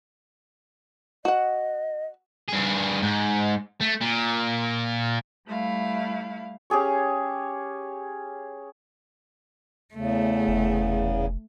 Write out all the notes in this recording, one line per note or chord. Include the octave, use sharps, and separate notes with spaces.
F#4 D#5 F#5
G2 G#4
G#2
A3
A#2
G3 A3 E4 F5
C#4 G4 G#4 C#5
E2 C#3 A3
F1